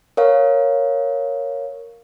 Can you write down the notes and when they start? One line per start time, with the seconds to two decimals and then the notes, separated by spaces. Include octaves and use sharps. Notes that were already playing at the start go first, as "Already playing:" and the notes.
0.17 A#4 C#5 F5